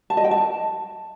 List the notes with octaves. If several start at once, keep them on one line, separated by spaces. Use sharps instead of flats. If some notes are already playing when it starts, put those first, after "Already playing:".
A5
D#5
G5
A5